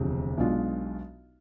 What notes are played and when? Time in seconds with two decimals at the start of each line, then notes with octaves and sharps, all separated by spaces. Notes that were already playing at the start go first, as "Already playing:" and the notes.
Already playing: E1 D2 C3 F3
0.37 B1 B2 G#3 D4 F4